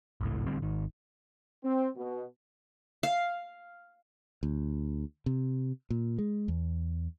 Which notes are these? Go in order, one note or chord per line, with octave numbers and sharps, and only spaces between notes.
G#1 C#2 A2
A1 D3 G3 C4
G#1 D#3
C4
B2
F5
D2
C3
A#2
G#3
E2